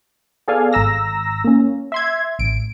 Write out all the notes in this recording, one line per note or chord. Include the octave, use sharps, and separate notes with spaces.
B3 G#4 A4 D5 F5 G#5
G#1 A#5 E6 A#6
A#3 C#4
E5 C6 G#6
A1 D7